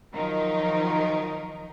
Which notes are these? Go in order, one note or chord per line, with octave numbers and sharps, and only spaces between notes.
D#3 F3 F#3 D#4 A#4